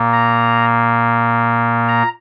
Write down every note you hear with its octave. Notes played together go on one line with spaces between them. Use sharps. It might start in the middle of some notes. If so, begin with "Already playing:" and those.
Already playing: A#2 A#3
A#5
A#5